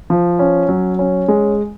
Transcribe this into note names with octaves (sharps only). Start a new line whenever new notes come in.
F3
C#4
F#3
C#4
G#3